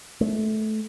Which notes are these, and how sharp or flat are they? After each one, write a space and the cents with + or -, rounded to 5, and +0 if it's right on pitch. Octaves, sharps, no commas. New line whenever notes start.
A3 -20